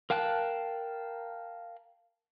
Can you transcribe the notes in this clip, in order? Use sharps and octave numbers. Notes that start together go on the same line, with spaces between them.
A#4 F5 G5 A5 F#6